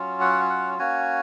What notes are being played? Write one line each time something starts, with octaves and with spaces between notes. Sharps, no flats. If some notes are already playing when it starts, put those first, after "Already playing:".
Already playing: F#3 C#4 F4
F#5
F#5
A#3 C#4 F#4 G#5